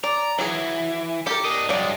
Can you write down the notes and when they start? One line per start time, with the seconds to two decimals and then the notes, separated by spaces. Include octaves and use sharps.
0.04 D5 A#5
0.39 E3 F#3 G#4
1.27 G4 A4 A#4
1.45 D4 D#5
1.69 G2 F#3 G#3 D5